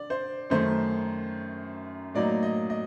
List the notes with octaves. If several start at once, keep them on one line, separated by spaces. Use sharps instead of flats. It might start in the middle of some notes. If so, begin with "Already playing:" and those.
Already playing: D3 D5
C5
F#2 D#3 A3 C5
A2 F#3 A#3 D#4 D5
D#5
D#5